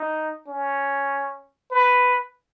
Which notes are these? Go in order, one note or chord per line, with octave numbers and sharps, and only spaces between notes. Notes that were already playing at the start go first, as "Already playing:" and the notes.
Already playing: D#4
C#4
B4